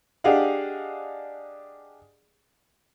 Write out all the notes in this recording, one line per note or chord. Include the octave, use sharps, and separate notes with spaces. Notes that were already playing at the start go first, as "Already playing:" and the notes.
D4 G4 G#4 D#5 F5 F#5